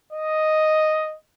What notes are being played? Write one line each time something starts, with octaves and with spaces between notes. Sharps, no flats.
D#5